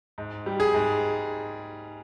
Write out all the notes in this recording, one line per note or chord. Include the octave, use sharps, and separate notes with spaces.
G#2
G3
G#4
G#2